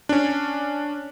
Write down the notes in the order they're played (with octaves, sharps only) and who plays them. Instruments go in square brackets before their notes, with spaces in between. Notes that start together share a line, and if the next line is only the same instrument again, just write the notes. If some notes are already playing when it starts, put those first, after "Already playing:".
[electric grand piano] C#4 D4